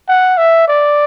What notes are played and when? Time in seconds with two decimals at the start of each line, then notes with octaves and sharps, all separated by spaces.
0.09 F#5
0.37 E5
0.68 D5